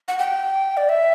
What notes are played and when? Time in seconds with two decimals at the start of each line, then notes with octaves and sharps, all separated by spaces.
0.08 F#5
0.19 G5
0.77 D5
0.89 E5